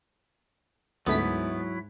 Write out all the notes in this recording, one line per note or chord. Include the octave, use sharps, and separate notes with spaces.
D2 G#2 F#3 A3 B3 E4 B6